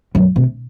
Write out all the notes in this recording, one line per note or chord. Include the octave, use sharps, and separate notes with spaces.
F#2
C3